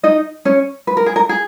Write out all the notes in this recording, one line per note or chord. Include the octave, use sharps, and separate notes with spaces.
D#4 D#5
C#4 C#5
B4
A#4
G#4
A#4
G#4